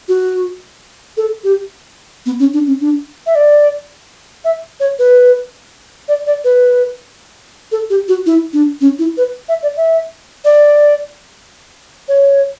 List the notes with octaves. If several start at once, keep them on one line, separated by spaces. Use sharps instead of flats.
F#4
A4
G4
B3
C#4
D4
C#4
D4
E5
D5
E5
C#5
B4
D5
D5
B4
A4
G4
F#4
E4
D4
C#4
E4
B4
E5
D5
E5
D5
C#5